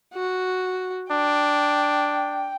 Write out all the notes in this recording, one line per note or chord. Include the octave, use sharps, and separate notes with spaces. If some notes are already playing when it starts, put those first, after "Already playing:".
F#4
D4 G5